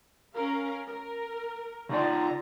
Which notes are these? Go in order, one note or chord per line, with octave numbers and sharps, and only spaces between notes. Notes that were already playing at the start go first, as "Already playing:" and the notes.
C#4 A#4 F5
A#4
C#3 D#4 F4 D5 A#5